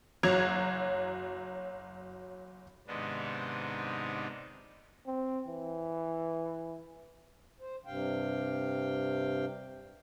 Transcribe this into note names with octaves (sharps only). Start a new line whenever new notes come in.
F#1 F#3 G#6 F7
G#2 C3 D#3 B3 D4 D#4
C4
E3
C5
G2 C3 F5 G5